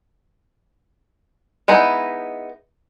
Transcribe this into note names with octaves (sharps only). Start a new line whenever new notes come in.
G#3 B3 D#4 E4